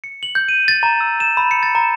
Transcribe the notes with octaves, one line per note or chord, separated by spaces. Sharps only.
C#7
F#7
G6
D#7
A6
A#5
E6
E7
B5
C#7
A6
A#5